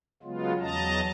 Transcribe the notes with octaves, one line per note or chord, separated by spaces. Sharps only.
C#3 F#3 G#3 B3 F4
E2 F#3 D#5 A5 A#5